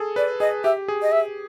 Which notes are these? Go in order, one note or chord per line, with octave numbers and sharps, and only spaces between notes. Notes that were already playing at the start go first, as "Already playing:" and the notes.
Already playing: G#4 A4
B4 D5
G#4 D#5
G4 E5
G#4
D#5
E5